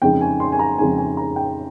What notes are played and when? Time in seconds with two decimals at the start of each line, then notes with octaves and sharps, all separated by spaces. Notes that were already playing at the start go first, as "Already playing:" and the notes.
0.02 F2 C#3 G#3 D#4 G5
0.21 G#5
0.40 C6
0.52 G#5
0.59 A#5
0.78 F2 C#3 G#3 D#4 G#5
0.98 G#5
1.17 A#5
1.36 G5